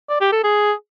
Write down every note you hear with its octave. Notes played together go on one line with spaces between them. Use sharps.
D5
G4
A4
G#4